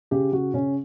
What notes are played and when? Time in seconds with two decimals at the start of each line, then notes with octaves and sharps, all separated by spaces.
0.11 C#3 G4
0.32 C#3 F#4
0.54 C#3 C#4